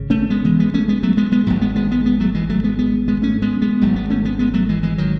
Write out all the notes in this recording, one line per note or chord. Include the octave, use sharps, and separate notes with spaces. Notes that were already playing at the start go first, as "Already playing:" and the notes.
Already playing: G#1 C#3
A3 C#4
G#3 B3
E3 G#3
G#3 B3
A3 C#4
G#3 B3
F#3 A3
G#3 B3
G#3 B3
G#1 G#2 F#3 A3
G#3 B3
G#3 B3
G#3 B3
G#3 B3
F#3 A3
E3 G#3
F#3 A3
G#3 B3
G#3 B3
G#3 B3
A3 C#4
G#3 B3
G#3 B3
G#1 G#2 F#3 A3
G#3 B3
A3 C#4
G#3 B3
G#3 B3
F#3 A3
E3 G#3
E3 G#3
D#3 F#3